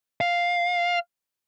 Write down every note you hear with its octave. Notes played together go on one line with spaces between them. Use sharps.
F5